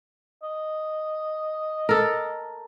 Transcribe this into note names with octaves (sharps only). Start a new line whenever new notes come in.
D#5
A4 A#4